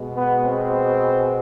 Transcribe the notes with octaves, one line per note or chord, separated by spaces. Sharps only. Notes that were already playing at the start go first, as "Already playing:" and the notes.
Already playing: B2 G#3
B3
C4